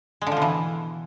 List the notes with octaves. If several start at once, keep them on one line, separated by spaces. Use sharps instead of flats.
G#3
D3
F3
B2
E3